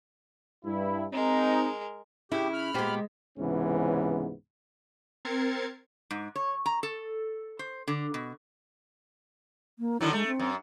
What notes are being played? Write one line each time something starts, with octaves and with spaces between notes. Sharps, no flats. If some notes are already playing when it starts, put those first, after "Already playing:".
G2 E4
G#3 C4 D#4 A#4
C#3 E4 G4
B5 F6
A#2 G#3 B3 G4 C5
C#2 G#2 C3 E3 B3 C#4
C4 A#4 G#6 A6 C7 C#7
G#2
C#5
A#5
A4
C5
D3
B2
A#3
D3 D#3 F#3 E4
G#3 A3
C4
F#2